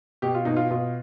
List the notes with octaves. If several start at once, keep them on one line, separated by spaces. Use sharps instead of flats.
B2 G4
F4
B2 D#4
F4
B2 F4